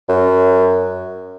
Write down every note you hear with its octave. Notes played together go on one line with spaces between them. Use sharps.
F#2